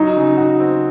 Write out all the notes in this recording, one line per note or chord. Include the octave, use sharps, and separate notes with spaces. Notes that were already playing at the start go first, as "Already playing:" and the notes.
Already playing: F#3 D#4
C#3
F#4
C4